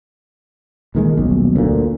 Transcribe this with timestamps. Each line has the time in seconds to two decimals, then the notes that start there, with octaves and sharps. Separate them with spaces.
0.95 A#2 D#3 G#3
1.17 D#1 B1
1.56 D2 A#2